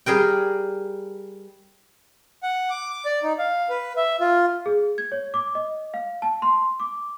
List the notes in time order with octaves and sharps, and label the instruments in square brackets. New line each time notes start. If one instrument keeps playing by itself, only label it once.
[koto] G3 G#4 A#4 G5
[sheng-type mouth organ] F#5
D6
D6
D5
D#4
F5
B4
E5
F4
[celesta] G#4
G#6
C#5
D6
D#5
F5
A5
C6
D6